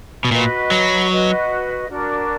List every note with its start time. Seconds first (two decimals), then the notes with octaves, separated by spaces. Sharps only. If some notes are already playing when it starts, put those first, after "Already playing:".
0.25 B2
0.31 A#2 F#4 B4 D#5
0.71 F#3
1.10 F#4 B4 D#5
1.88 D4 F#4 A#4